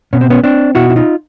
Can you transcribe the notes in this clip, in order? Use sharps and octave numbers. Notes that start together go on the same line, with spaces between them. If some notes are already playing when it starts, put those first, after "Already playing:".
B2 C#4
C4
B3 C#4
C4 D4
B2 E4 F#4
E4
D#4 F4